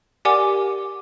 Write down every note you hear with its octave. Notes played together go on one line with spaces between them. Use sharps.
G4 A#4 D5 F#5 G#5 D6